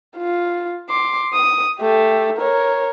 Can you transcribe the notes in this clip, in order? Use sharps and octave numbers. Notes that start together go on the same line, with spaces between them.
F4
C6 D6
D#6
A3 G4
A#4 C#5